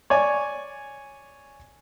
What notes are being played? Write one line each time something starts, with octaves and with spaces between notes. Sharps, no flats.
C#5 D5 G#5